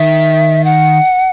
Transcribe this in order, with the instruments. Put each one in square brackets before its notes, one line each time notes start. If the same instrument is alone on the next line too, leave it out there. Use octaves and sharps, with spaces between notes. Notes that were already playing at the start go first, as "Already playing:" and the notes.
Already playing: [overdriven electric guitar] D#3 [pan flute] E5
[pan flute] F#5